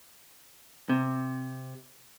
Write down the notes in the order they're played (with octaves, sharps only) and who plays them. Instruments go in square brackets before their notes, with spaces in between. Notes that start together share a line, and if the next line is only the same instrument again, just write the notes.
[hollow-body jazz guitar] C3